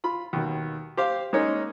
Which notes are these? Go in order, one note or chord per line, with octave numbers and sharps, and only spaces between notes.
F4 B5
D#2 B2 D#3
G4 C5 F5
G#3 A#3 C#4 D#4 C#5